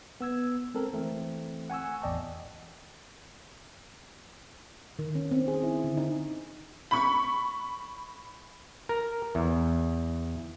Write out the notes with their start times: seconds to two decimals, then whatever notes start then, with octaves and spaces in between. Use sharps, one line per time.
0.21 B3 E6 G#6
0.74 G#3 C4 A4 A#4
0.93 E3 A3 C4
1.70 F#5 G#5 C#6 E6
2.02 A1 E2 D5 D#5 G5 A5
4.99 D#3
5.15 C#4
5.31 C4
5.48 G#4
5.63 E4
5.84 D3
5.97 D#4
6.91 B5 C#6
8.89 A#4
9.35 E2